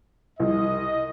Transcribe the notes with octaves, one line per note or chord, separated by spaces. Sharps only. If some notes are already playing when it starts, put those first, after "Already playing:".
C2 D#5